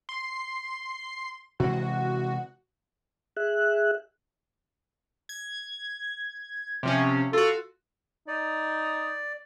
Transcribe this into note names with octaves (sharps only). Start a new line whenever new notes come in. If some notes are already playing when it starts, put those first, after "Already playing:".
C6
C3 E3 G#3 F#4
G#4 E5 F#6
G#6
C3 F3 C#4
F4 F#4 A4
D#4 D5